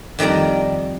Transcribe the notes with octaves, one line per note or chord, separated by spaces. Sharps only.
F2 D#3 G3 D5 A#5